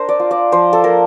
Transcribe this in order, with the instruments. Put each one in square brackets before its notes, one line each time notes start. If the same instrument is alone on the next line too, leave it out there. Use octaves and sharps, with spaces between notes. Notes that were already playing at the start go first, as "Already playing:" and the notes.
Already playing: [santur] D4 A#4 C5
D5
F4
D5
F3 C5
A4
A#3 A#4